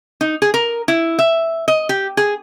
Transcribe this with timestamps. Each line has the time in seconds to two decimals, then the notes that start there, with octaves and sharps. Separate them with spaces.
0.21 D#4
0.42 G#4
0.54 A#4
0.88 E4
1.19 E5
1.68 D#5
1.89 G4
2.17 G#4